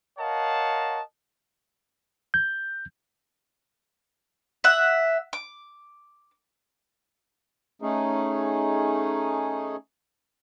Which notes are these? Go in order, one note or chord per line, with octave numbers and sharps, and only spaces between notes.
A#4 C#5 D#5 F5 F#5 A5
G6
E5 F#5
D6
A3 C#4 D#4 G#4